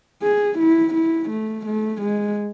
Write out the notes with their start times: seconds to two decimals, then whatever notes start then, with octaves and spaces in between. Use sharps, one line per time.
0.23 G#4
0.59 E4
0.94 E4
1.30 A3
1.66 A3
2.01 G#3